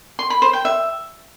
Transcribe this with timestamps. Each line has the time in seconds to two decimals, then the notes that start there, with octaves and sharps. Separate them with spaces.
0.19 C6
0.30 B5
0.42 C5
0.53 G5
0.65 E5